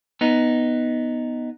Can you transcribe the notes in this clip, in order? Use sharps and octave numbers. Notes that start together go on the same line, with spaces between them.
B3 D#4